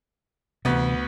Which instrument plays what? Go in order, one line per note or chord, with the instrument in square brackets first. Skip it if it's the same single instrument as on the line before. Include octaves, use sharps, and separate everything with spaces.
[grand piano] D2 B3 [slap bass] C3 E3